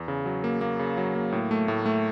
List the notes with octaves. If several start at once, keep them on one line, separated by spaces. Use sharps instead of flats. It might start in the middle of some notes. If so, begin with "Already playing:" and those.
Already playing: E2
C#3
F#3
A#3
A#3
C#3
F#3
A#3
A2
A3
A2
A3